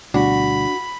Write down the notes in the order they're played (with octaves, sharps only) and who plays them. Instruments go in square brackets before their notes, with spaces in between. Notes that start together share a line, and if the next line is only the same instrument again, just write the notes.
[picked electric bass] D2 B2 G3 [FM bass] D4 [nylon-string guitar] F#4 [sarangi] B5